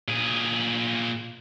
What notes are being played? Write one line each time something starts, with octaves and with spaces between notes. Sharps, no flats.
A#2 G#4